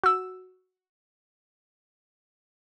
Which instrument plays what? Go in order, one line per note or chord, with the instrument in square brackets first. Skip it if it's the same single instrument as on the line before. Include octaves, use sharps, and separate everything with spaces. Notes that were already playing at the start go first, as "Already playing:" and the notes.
[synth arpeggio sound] F#4 E6